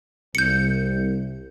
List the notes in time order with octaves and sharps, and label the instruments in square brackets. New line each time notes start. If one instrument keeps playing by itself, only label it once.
[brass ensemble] C2 [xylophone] G6 C#7